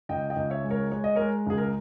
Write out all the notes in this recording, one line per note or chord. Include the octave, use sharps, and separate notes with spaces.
C#2 D#5 G5
D#5 G5
C#2
C#5 E5
G#3
A#4 C#5
G#3 C#5
D#5
G#3 A#4 C#5
C#2 G#4
A#4